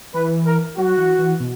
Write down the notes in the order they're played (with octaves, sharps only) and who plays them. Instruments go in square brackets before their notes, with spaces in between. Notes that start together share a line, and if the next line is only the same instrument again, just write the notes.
[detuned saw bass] E3 [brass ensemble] B4
[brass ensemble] A#4
[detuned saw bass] F#3 [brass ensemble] F#4
[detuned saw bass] E3
E3
B2